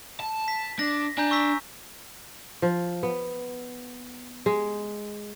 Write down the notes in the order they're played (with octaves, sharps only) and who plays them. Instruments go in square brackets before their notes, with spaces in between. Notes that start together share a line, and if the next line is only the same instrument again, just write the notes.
[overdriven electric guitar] A5
[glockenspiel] B6
[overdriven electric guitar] D4 [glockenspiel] A#6
[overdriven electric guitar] D4 [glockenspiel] G#5 A#5 G6
[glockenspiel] C#6 E6 B6
[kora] F3
B3
G#3